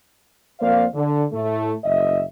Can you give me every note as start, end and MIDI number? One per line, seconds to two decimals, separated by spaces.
0.60 0.85 41
0.60 0.85 58
0.60 0.85 72
0.60 0.85 74
0.60 0.85 77
0.94 1.24 50
1.32 1.73 45
1.32 1.73 57
1.84 2.22 30
1.84 2.22 75
1.84 2.22 76